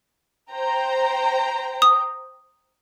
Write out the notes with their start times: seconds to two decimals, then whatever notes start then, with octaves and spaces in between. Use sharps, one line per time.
0.52 C5 G5 A#5
1.82 D#6